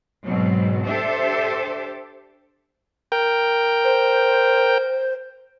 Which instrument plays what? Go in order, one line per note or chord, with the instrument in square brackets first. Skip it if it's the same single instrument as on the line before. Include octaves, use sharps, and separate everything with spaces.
[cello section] G#2 B2 F#3 C4
D4 G4 A4 C5 E5
[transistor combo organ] A#4 G5
[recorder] C5